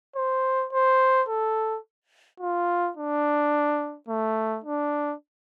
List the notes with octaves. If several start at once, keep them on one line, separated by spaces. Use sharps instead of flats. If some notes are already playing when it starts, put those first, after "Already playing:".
C5
C5
A4
F4
D4
A3
D4